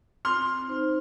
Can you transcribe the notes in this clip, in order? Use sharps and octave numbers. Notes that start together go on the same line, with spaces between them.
C4 C6 F6
D#4 C5